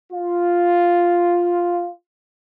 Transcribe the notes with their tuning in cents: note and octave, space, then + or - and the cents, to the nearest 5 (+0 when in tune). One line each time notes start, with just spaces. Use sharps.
F4 +0